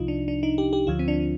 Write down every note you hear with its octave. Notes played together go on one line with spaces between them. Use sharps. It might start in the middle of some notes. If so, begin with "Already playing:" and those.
Already playing: C2 C3 F3 D#4 F4
D4
D4
D#4
G4
G4
D2 D3 F3 F4
C4
D4